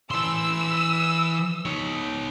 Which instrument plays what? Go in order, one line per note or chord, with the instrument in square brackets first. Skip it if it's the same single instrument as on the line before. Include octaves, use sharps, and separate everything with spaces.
[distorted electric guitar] E3 C6 [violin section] E6
[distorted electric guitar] D#4 C#5